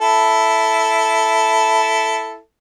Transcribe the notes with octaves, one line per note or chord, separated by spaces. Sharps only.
E4 A4